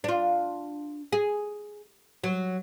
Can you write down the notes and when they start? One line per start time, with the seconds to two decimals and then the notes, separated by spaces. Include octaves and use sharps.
0.04 D4 F4
1.12 G#4
2.24 F#3